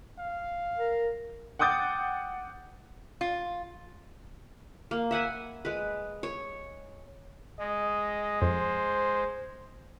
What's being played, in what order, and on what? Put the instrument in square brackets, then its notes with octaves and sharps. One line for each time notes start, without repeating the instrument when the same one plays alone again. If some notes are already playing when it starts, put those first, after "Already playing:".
[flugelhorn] F5
[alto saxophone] A#4
[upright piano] F#5 G5 D6 D#6 G6 A6
[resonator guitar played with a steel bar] F4
[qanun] A#3
E5 F#5 G#5 B5
G#3 B4
C#5
[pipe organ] G#3 [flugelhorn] D#5
[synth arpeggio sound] F2 [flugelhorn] C5